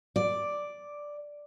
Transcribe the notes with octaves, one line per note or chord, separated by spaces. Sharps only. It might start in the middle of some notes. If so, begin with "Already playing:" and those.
D5